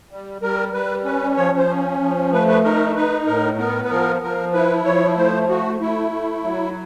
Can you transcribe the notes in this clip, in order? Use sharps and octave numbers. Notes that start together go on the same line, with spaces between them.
G3
G3 A#4
G3 B4
C#4 B4
F3 C#5
C5
C#4
F3
A3 B4
B4
D#4 A#4
D#4 B4
A2 A#4
B3 A#4
B4
F3 A#4
F3 A#4
E4 B4
F3 C#5
A3 C5
A3 F#4
A3 E4
A3
F#3